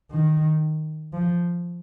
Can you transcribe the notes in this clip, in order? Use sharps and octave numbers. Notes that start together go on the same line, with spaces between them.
D#3
F3